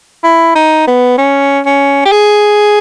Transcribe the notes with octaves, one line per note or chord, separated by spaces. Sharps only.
E4
D#4
B3
C#4
C#4
G4
G#4